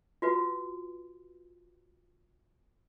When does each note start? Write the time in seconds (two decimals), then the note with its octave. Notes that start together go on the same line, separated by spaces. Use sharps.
0.22 F4 F#4 B4